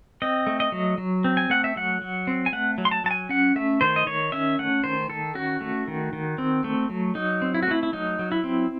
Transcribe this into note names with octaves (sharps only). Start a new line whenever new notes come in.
C4 D#5
A3
D#5
F#3
F#3
C4
G#5
A3 F#5
E5
F#3 F#5
F#3
C4
G#5
A3 F#5
F#3
C6
A5
F#3 A5
G#5
C#4 F#5
A3 E5
D#3 C5
D#5
D#3 C#5
C#4 E5
A3 F#5
D#3 C5
D#3 A4
C#4 F#4
A3
D#3
D#3
C4
A3
F#3
F#3 D#4
C4
E4
F#4
A3 E4
E4
F#3 D#4
F#3
E4
C4